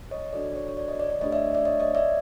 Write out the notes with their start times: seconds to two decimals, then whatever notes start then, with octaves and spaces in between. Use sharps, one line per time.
0.11 C#5 D#5
0.33 D4 F#4 A4 D5
0.55 C#5
0.68 C#5
0.77 D5
0.88 C#5 D#5
1.00 D5
1.10 D5
1.21 A3 D4 G4 C#5 D#5
1.32 D5 E5
1.54 D5 E5
1.65 C#5 D#5
1.80 C#5 D#5
1.95 D5 E5